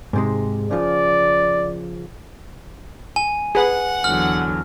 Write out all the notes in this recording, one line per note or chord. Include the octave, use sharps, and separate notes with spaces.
G#2 C3 G#3
C#3 F3 D5
G#5
G#4 B4 F#5
E2 D3 F#3 F6